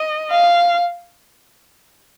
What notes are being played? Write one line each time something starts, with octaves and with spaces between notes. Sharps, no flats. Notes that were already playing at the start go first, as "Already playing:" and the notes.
Already playing: D#5
F5